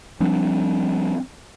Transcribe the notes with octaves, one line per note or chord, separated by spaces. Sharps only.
F3 G3 C4 D4